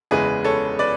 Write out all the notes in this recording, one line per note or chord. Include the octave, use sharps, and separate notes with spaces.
F#1 E2 C#3 E3 G#3 G#4 B4
A4 C#5
B4 D5